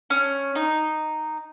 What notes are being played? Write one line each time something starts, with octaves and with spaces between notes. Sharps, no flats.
C#4
D#4